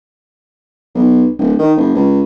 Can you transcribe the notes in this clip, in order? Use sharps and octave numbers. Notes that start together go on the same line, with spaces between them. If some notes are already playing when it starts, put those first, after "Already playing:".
B1
D1
D#3
F#1
C#2